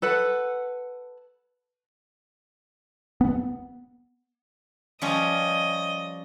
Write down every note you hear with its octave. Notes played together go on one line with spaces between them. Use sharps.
A4 B4 F#5
B3
F3 G3 C#4 D#5